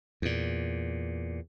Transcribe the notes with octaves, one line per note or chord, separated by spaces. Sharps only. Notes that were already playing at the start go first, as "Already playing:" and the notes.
E2 A#2